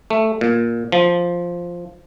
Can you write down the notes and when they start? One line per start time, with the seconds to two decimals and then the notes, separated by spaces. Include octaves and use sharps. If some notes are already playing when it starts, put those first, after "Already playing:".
0.10 A3
0.41 A#2
0.92 F3